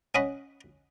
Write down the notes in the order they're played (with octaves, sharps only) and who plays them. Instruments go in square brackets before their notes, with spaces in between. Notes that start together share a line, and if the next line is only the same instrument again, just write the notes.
[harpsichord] C#4 D#5 F#5 B5